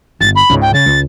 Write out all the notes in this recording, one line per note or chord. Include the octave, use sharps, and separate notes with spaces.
G1 A6
B5
C#2 G#2 C#3
G5
C#3 A6
C#2